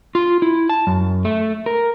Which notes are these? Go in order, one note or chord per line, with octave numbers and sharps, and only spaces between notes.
F4
E4
A5
F#2
A3
A#4